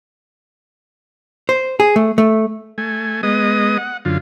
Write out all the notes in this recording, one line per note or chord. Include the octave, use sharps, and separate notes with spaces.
C5
G#4
A3
A3
A3 G#5
G#3 B3 D#5 D#6
F#5
F#2 D3 F4